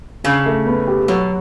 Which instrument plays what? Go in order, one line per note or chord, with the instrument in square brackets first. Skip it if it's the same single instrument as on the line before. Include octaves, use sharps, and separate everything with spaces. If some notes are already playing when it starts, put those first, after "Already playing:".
[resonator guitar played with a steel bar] C#3 [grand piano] D4
[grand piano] A3
B3
G4
[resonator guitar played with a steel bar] B2 [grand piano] F#3